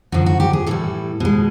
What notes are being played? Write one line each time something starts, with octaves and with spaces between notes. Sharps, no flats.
F#2 D3 F3 F#4
F#4
G4
G#4
A2 E3 G3 A4
B2 G#3